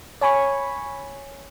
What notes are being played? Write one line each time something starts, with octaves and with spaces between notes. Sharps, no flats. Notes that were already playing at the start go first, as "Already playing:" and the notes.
C#5 G#5 B5 C#6